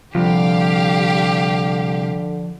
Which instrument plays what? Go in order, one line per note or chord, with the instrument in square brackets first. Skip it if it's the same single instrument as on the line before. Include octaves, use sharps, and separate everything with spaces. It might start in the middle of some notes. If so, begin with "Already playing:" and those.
[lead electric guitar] C2 [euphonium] D3 [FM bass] F3 [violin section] G4 F5